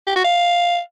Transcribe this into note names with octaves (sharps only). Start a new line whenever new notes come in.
G4
F#4
F5